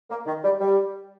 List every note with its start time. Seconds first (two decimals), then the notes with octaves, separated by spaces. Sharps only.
0.10 A#3
0.26 D#3
0.44 G3
0.61 G3